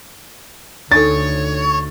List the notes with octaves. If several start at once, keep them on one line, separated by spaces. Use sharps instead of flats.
D2 D4 D#4 A4 C#5 A6